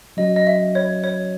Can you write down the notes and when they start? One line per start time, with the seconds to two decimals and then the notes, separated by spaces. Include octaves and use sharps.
0.17 F#3 C#4 F#4 D#5
0.36 D#5
0.47 E5
0.75 C#5
1.04 C#5